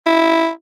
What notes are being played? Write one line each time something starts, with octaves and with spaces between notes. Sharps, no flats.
E4